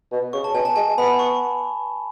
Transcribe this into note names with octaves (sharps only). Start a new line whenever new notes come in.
B2
C#3 C#6
A5
B2 G#5
A5
G#3 G#5
B3 B5
C#6